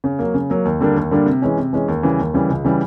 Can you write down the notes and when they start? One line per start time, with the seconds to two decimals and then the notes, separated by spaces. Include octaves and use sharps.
0.04 C#3
0.19 F#3 A#3
0.34 C#3
0.50 F#3 A#3
0.65 D#2
0.80 D3 G3 A#3 D4
0.96 D#2
1.11 D3 G3 A#3 D4
1.26 C3
1.42 E3 G#3 C#4
1.57 C3
1.73 E3 G#3 C#4
1.88 D#2
2.03 C#3 E3 G3
2.19 D#2
2.34 C#3 E3 G3
2.49 C#2
2.65 C#3 E3 G3